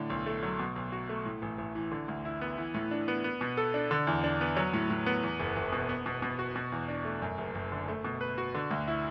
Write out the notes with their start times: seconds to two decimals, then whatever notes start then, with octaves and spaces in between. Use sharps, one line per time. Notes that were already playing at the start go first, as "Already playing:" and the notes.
Already playing: A2 D3
0.10 B1
0.26 A3
0.43 F#3
0.59 B2
0.76 B1
0.92 F#4
1.09 A3
1.25 A2
1.42 A1
1.58 A1
1.75 E3
1.92 D3
2.08 D2
2.25 E4
2.41 B3
2.57 E3
2.74 A2
2.91 D4
3.08 B3
3.24 B3
3.41 B2
3.57 A4
3.74 D4
3.91 D3
4.07 E2
4.24 D4
4.41 B3
4.57 F#3
4.73 A2
4.90 A2
5.06 B3
5.23 E2
5.39 F#1
5.56 F#1
5.72 B2
5.89 B3
6.06 B2
6.22 B2
6.39 F#4
6.56 B2
6.72 E2
6.88 D4
7.05 A3
7.22 F#2
7.38 F#1
7.55 F#1
7.72 D3
7.88 A3
8.04 B2
8.21 B4
8.38 F#4
8.55 D3
8.71 D2
8.88 E4